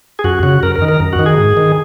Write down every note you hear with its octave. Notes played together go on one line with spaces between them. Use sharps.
G#4
F#2 F#4
C#3 F#4
F#2 A#4
A#4
D#3
A#4
F#2
F#4
D#3
G#4
G#2
D#3